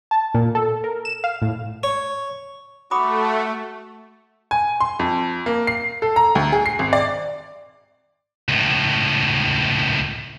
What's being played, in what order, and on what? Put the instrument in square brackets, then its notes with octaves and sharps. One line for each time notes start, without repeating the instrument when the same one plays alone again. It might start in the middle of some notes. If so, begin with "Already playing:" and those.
[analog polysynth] A5
A#2
A4
A#4
E7
F5
A2
[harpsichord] C#5
[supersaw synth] A3 [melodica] F#4 [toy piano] B5 D6 D#6
[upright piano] G#5
C6
F2
A#3
C7
A4
A#5
D2
G#4
C7
G#1
D5
[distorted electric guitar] C#2 A2